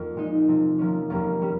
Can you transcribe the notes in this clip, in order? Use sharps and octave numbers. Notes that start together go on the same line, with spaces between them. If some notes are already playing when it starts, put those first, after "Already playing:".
Already playing: F2 A#3 F4
A#2 G#3 C4 D#4
C3 F3 C4
C3 F3 A#3 C#4
F2 C3 G3 A#3 C#4 F4
G3 C#4